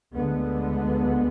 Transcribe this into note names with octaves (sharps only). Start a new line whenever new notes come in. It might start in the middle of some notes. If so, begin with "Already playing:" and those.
D2 D3 G#3 B3